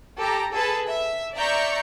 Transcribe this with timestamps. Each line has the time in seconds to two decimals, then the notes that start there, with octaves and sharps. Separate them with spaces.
0.20 G4 A4 A#5
0.53 G#4 A4 B4 A5 B5
0.87 E5
1.36 D5 E5 A#5 C#6 G6 C#7